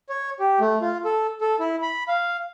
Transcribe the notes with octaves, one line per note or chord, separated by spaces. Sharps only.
C#5
G4
A3
F4
A4
A4
E4
B5
F5